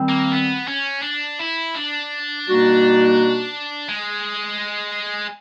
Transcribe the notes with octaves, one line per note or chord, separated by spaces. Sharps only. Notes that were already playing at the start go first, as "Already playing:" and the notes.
Already playing: D#3 G3 C4
A#3
B3
C#4
D4
E4
D4
B2 G3 A#3 D#4 F#4
G#3